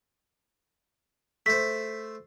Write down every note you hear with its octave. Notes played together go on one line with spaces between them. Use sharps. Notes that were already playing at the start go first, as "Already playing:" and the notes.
A3 C5 B6